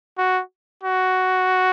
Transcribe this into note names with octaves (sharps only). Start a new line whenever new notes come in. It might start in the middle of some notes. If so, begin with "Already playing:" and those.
F#4
F#4